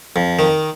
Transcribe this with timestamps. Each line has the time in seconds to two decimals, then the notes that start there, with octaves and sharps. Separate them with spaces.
0.16 F2
0.39 D#3